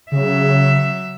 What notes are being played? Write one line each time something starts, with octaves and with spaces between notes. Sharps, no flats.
C#3 F#3 E5